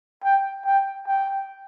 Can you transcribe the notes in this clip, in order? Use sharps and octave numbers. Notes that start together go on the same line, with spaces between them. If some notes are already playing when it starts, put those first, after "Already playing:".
G5
G5
G5